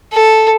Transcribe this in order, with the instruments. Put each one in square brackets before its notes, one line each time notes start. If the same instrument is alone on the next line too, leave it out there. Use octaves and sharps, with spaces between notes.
[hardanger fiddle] A4